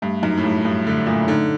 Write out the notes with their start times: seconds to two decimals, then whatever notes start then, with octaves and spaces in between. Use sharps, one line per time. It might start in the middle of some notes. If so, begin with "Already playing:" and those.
0.02 G2 A3
0.23 F#2 D#4
0.38 A2
0.43 G2 A3
0.65 G2 A3
0.87 D3 A3
1.06 A#2 A3
1.28 D3 D#4